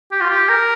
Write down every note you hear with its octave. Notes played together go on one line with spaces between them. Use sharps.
G4
F4
G4
A#4